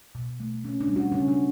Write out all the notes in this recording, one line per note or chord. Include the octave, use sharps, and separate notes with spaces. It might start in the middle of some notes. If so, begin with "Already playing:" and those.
B2
A3
C#3 C#4
D4
G3
F#4
C#3 C#4
D4